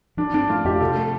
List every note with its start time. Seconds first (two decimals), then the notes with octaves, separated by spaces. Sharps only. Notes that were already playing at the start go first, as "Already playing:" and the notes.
0.17 F3 D4
0.34 C4 D4
0.49 A3 F4
0.64 F2 G4
0.80 C3 A4
0.96 A3 A4